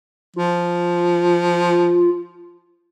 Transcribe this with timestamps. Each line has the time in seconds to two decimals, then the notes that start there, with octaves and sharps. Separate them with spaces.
0.36 F3 F4